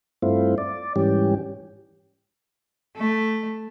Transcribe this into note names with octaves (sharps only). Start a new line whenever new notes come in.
G2 A3 C4 E4 F4
D5
G#2 E3 G3 C#4 G4
A3